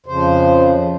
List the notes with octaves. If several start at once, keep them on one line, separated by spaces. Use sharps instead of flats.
F2 C#3 F3 C5